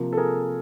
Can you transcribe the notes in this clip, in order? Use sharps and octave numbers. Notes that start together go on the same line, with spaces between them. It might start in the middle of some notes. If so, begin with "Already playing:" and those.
Already playing: C3 F3 A#3
A4
G#4 A#4